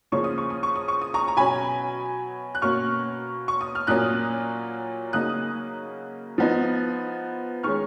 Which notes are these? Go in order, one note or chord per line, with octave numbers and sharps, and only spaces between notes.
C#3 F3 A#3 C#4 C#6
D#6
C#6
D#6
C#6
D#6
C#6
D#6
A#5 C#6
A#5
B2 F#3 C#4 G#5 B5
F#6
B2 A#3 C#4 C#6 F6
C#6
D#6
F6
A#2 F#3 A#3 C#4 D#6 F#6
C#3 F#3 A#3 D#4 D#6 F#6
F3 B3 D#4
D#3 G#3 C#4 C#6 F6